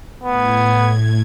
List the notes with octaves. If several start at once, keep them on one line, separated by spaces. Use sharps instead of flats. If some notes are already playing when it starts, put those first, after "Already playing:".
A2 B3 G#6